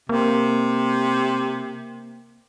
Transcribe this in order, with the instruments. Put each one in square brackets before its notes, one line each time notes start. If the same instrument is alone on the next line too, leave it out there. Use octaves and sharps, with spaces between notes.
[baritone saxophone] C3 [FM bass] A#3